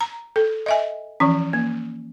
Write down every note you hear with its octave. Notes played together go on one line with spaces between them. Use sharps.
A#5
A4
D#5 E5 G#5
E3 F3 C#4
A#3